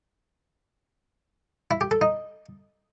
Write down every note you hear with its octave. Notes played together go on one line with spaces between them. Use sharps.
E4
G4
A4
D#4